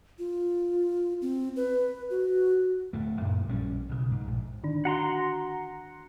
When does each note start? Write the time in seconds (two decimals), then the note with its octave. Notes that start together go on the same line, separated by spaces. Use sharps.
0.19 F4
1.22 C4
1.56 B4
2.10 F#4
2.93 D1 A3
3.21 F#2 A#2
3.48 A#1 G3 C#4
3.89 B1 C#3
4.11 G#2
4.28 A#1
4.64 D3 D#3 D4
4.85 F#4 F#5 A#5 C6